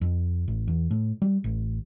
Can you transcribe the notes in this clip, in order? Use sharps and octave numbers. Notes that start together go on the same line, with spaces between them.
F2
A1
E2
A2
G3
A1